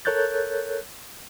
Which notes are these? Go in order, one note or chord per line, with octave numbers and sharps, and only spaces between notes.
A4 A#4 C#5 F#6 G6 A6